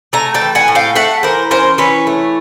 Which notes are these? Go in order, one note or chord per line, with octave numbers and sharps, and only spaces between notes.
A3 G#5 A#5
G5 A5
E3
F#5 G#5
A2
F5 G5
A3 E5 F#5
E3 A#4 C5
C#4 A#4 C5
E3 B4 C#5
A3